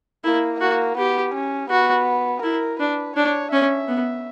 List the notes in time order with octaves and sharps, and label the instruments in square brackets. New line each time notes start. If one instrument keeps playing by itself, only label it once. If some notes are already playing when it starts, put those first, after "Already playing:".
[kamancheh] A#3 [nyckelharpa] E4
[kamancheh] A#3 [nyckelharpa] F#4
[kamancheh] B3 [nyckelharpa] G4
[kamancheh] C#4
[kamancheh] B3 [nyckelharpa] F#4
[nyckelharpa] E4 [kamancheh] A#4
[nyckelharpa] D4 [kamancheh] B4
[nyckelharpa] D4 [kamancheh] C#5
[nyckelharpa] C#4 [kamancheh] E5
[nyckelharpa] B3